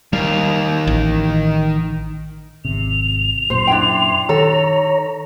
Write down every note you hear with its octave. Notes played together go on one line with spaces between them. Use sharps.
D#3 G3 F5
A1
G#1 C3 F7
F#2 A#2 C5 C6
D4 E4 G5
D#3 A4 C#5 A#5